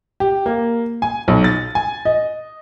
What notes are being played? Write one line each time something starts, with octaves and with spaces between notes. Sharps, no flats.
G4
A#3
G#5
B1
A6
G#5
D#5